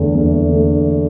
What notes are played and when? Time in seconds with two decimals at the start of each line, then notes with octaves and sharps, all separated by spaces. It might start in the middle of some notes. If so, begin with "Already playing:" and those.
Already playing: E2 D3 A3
0.15 E2
0.50 D3 A3